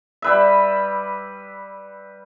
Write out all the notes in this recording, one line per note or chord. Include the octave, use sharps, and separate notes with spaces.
G3 B4 E5